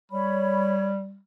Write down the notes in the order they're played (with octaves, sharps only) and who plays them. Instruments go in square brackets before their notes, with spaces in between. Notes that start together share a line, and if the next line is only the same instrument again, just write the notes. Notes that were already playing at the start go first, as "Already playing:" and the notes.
[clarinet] G3 [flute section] C#5 B5